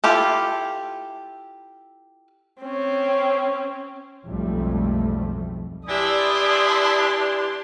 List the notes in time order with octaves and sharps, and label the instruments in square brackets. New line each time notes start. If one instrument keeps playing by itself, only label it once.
[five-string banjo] E4 F4 G4 A4
[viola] C4 C#4
[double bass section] B1 F2 G#2 G3 A3
[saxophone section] E3 D4 G4 [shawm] E4 [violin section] D5 A5 C6 [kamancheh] D#6